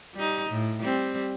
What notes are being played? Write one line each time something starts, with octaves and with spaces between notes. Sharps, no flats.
G3 D#4
A2
G3 C4